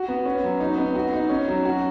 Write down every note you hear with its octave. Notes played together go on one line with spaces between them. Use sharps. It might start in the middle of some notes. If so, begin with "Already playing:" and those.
Already playing: F#4
B3
C#4
F#3
D#4
B3
F#4
D#4
C#4
F#3
F#4